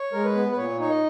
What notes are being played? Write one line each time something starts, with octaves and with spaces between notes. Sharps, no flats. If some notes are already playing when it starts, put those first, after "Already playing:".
Already playing: C#5
G#3 A#4
B4
B3
B4
A#2 C#5
D#4 C#5
D#5